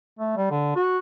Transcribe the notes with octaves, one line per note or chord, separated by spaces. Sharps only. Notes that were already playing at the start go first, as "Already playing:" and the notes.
A3
G3
D3
F#4